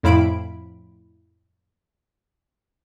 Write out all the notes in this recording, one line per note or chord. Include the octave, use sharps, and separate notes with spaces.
F2 A2 E4 F5 B5 D7